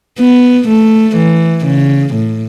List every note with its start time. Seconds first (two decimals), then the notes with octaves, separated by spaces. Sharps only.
0.19 B3
0.68 A3
1.17 E3
1.65 C#3
2.14 A2